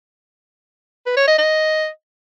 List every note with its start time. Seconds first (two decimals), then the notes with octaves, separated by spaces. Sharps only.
1.07 B4
1.17 C#5
1.28 D#5
1.38 D#5